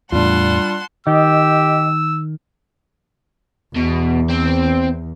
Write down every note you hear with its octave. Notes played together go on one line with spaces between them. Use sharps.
E2 A2 G3 D4 F4 F#5 A5 C6
D#3 G4 D#5 E6
E2 B2
C4